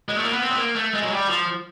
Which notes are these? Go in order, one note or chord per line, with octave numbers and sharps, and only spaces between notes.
G#3
A3
A#3
B3
C4
B3
A#3
A3
G#3
F#3
G3
F3